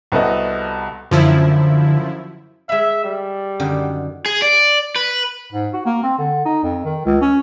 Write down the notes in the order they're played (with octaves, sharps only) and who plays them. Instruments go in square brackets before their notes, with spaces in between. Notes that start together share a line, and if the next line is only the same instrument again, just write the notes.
[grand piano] C2 B3 F#4 A4 D#5
[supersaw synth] F#2 F3 E4 [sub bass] D3
[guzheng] G#3 B5 [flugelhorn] E5
[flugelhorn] G3
[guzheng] F#2 D3 D#3
[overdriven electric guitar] G#4
D5
B4
[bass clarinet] G#2
F#4
A#3
C4
D3
D#4
F2
D#3
C#2
C#4